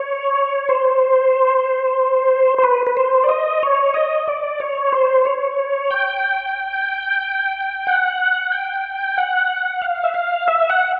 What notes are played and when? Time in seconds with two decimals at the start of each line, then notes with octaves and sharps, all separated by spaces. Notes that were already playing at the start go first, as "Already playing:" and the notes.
Already playing: C#5
0.69 C5
2.58 C5
2.64 B4
2.87 B4
2.97 C5
3.24 D5
3.29 D#5
3.63 C#5
3.94 D#5
4.28 D5
4.60 C#5
4.92 C5
5.25 C#5
5.91 G5
7.87 F#5
8.52 G5
9.17 F#5
9.82 F5
10.04 E5
10.14 F5
10.48 E5
10.70 F#5